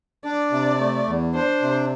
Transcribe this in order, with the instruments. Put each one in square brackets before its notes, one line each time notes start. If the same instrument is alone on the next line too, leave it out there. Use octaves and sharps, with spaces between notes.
[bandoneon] D4 [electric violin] D5
[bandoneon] C3
A3
E2
[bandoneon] D4 [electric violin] C5
[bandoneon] C3